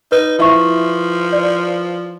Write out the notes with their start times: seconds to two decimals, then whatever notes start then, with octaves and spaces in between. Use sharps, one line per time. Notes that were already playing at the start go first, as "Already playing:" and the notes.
0.12 D#4 B4
0.39 F3 E4 E5 C#6
1.32 D5